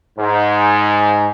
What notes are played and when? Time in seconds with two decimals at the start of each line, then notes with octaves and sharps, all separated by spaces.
0.19 G#2